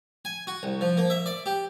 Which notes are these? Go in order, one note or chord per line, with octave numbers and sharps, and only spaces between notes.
G#5
F#4
C2
F3
A#3
E5
D5
G4